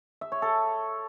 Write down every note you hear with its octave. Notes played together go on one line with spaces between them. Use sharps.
E5
C#5
A4